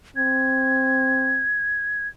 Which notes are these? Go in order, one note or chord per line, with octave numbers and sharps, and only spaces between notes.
C4 G#6